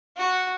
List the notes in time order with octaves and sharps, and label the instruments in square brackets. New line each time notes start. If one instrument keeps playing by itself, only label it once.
[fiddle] F#4